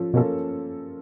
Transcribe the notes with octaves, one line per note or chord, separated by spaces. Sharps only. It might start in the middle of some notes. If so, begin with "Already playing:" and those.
Already playing: F3 C#4 A4
B2 A#3 C#4 F4 A4